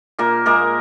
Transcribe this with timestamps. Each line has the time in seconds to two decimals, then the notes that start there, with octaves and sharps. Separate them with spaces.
0.19 A#2 A#3 A#4
0.46 G#3 A#3 A#4